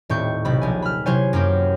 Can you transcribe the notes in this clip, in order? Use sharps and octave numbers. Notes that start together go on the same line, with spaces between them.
D#1 A2 C4 C#6 G6
B1 C3 B5
A#1 G#5
B5 F6
C3 F#3 E4 C5 C#5 G#5
F#2 A#3 G4